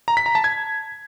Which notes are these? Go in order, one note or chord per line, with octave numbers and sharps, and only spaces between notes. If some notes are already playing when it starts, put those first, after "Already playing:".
A#5
B6
A#5
A5
G#6